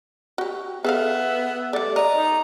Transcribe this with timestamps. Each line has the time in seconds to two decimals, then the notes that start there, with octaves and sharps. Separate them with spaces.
0.38 F#4 G4
0.84 B3 G#4 A4 E5 F5
1.73 G3 A3 D5
1.96 C#5 D#5 A#5
2.13 D#4